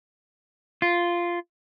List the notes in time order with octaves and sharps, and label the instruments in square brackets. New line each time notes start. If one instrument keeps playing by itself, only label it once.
[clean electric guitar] F4